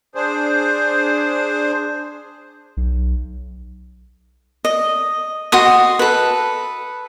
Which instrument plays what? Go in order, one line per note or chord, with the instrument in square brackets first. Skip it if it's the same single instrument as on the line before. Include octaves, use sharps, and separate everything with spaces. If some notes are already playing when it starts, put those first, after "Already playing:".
[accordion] D4 G#4 C5
[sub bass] B1
[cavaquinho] D#5
F#4 D#5 C6 D#6
A4 B4